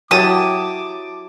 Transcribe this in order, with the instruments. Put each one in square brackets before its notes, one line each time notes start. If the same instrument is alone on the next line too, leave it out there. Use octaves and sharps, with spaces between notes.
[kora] F#3 E4 G4 [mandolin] A5 D#6 [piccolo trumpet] D6